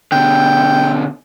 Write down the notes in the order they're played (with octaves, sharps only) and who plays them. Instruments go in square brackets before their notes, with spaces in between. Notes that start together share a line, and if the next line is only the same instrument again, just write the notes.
[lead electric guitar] B2 D3 [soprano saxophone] G5